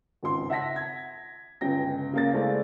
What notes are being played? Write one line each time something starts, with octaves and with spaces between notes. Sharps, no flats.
G#1 C#2 C6
E5 F#5 A5 A#6 B6
G#6
G1 C#2 C#3 G5 A#6
C#3 A#3 A6
G#3 A3 E4 C5 D5 F5